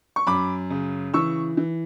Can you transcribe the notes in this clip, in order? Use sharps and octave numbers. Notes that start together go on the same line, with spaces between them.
C#6
F#2 B5 D6
C#3
E3 C#6 E6
E3